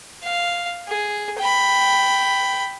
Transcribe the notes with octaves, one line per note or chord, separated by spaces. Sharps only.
F5
G#4
G5 B5